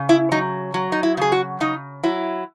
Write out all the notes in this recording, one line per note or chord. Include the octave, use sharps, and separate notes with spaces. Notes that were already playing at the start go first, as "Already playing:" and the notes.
Already playing: C#3
E4
F#3 D#4
F#3
D#4
E4
C#3 G#4
F#4
C#3 D#4
F#3 E4